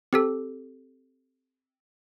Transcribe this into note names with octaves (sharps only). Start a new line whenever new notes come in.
C4 G4 A4